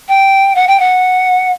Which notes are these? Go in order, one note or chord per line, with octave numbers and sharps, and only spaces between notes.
G5
F#5
G5
F#5